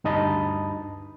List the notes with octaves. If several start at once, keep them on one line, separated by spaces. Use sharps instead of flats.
D2 G2 D#4 D#5 A5 B5